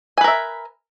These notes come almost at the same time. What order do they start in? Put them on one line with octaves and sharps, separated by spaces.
G#5 B4 A#4 E5